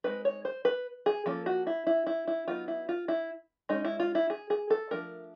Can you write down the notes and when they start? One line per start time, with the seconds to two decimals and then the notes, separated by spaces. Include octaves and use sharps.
0.04 G#3 C4 D#4 B4
0.25 C#5
0.45 C5
0.65 B4
1.06 G#4
1.26 F3 A#3 C#4 A4
1.46 F#4
1.67 E4
1.87 E4
2.07 E4
2.27 E4
2.48 F#3 B3 D#4 F4
2.68 E4
2.89 F4
3.08 E4
3.69 G#3 C#4 D#4
3.85 E4
4.00 F4
4.15 E4
4.30 G#4
4.50 G#4
4.70 A4
4.91 F3 A3 D4 A#4